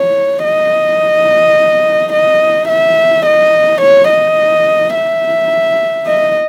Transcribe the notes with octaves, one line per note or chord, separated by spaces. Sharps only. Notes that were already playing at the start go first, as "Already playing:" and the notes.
Already playing: C#5
D#5
D#5
E5
D#5
C#5
D#5
E5
D#5